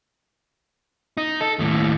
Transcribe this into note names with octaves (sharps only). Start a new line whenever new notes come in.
D#4
A4
D#2 A2